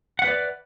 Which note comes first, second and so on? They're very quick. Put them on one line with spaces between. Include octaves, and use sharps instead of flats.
F#5 E5 B4 D5